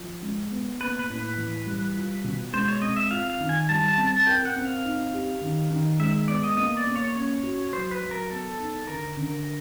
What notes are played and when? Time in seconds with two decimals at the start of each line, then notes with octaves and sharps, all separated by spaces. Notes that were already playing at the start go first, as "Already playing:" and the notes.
Already playing: F3
0.22 G#3
0.51 B3
0.80 A#3 B4
0.99 B4
1.10 A2
1.18 B4
1.37 E3
1.66 G3
1.96 F4
2.24 B2
2.53 G#3 C5
2.68 C#5
2.82 C4 D#5
2.96 E5
3.10 F4 F5
3.30 F5
3.40 D#3
3.49 G#5
3.69 G3 A5
3.88 A5
3.97 C4
4.07 A5
4.26 A#4 G5
4.45 F#5
4.56 C4
4.65 F5
4.85 D#4
5.13 G4
5.41 D#3
5.70 D#3
5.99 G#3 E5
6.28 B3 D5
6.43 D#5
6.57 A#3 D#5
6.77 D5
6.86 A#3
6.96 C#5
7.15 C#4 C#5
7.43 F#4
7.72 F#3 C5
7.91 B4
8.02 F#3
8.11 A#4
8.31 B3 A4
8.60 D#4
8.87 D3 A#4
9.17 D3